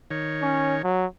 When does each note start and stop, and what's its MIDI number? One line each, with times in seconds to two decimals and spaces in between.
0.11 0.82 51
0.11 0.82 73
0.42 0.77 61
0.84 1.06 54